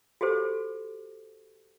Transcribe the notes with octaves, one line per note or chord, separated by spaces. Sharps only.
F#4 G4 A4 C5